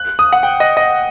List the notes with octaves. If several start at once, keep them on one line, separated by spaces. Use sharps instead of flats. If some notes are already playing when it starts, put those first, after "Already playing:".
Already playing: F#6
D#6
F#5
G5
D#5
D#5